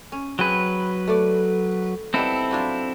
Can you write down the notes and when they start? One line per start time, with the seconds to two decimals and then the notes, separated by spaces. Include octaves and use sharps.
0.12 C#4
0.39 F#3 C4 G#4 B4
1.08 A3 D5
2.14 G3 B3 C4 D#4 E4 A4
2.51 F#3 D4 F4